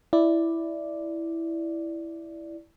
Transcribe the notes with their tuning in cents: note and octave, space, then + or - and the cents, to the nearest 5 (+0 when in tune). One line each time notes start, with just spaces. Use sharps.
E4 +0 D5 +0